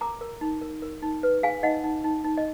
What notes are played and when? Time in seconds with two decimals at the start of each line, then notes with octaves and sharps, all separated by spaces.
0.01 A#4 A#5 D6
0.21 A#4
0.41 D#4
0.62 A#4
0.82 A#4
1.03 D#4
1.23 B4
1.43 G#4 F5 G#5
1.63 D#4 D#5 F#5
1.84 D#4
2.04 D#4
2.24 D#4
2.37 D#5